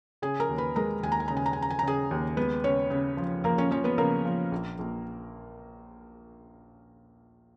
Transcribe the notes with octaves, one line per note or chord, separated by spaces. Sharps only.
C#3 G#4 G#5
A#4 A#5
D#2
B4 B5
G#3 A#4 A#5
D#2 G#5
A#5
G#5
C#3 A#5
G#5
A#5
C#3 G#5
A#5
G#5
A#5
C#3 G#4 G#5
D#2
G#3 B3 B4
C#3 C#4 C#5
C#3
F3
F3 A#3 A#4
C#4 C#5
F3 C#4 C#5
B3 B4
C#3 A#3 A#4
F3
A#1
A#1